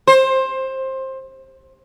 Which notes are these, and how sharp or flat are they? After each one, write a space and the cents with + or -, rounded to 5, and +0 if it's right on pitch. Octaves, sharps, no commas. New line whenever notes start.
C5 +20